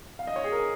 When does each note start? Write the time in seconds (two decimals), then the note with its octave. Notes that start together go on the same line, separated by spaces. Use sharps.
0.19 F5
0.27 D#5
0.36 C#5
0.44 G#4
0.52 A#4